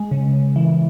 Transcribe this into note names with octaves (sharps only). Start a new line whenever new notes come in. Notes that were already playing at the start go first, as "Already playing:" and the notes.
Already playing: G#3
C#3
C#3
E3